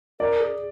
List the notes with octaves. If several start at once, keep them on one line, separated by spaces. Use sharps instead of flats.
A#4 D5
G#4